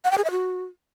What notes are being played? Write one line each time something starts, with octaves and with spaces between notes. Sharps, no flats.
F#5
G5
G#4
E5
F#4